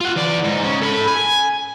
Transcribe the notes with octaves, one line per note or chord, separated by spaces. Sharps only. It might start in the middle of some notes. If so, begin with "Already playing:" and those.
F4 F#5
E3 D5
G#2 D#4
C#3 C#4
A4 B5
G#5